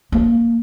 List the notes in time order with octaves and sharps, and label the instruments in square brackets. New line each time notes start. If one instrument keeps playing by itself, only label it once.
[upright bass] A#3